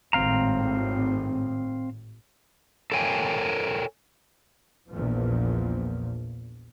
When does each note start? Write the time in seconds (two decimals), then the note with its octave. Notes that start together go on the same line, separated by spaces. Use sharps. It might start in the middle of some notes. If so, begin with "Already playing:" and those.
0.13 G#1 A2 C4 F5 A#5
2.92 A4 A#4 C#5 G5 G#5
4.90 A#1 E2 A#2 F3